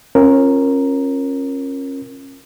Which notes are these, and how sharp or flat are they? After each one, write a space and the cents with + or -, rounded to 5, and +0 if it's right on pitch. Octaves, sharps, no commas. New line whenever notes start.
C#4 -25 F4 +0 A#4 +0